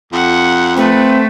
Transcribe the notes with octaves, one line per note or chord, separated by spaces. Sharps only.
F2 F#5
A3 C4 B4